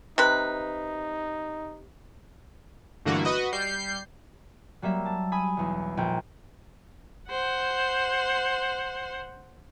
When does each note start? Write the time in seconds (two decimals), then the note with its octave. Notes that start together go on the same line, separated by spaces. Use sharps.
0.18 C3 D#4 B4
3.05 G2 D3 E3 A3 A#3 F#4
3.25 F#4 B4 D#5
3.53 G3 G6 C7
4.82 F#3 G3 A#3 E5
5.06 A5
5.32 G#5 B5 D#6
5.57 B1 E2
5.97 A#1 G5
7.30 C5 F#5